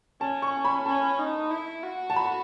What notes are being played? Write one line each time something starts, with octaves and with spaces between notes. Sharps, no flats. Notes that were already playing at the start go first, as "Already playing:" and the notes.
C#4 A5
C#6
B5
C#4 A5
D#4
E4
F#4
A5
B5